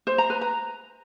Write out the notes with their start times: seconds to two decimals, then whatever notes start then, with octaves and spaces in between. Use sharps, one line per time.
0.07 C5
0.18 A#5
0.30 B4
0.41 A#5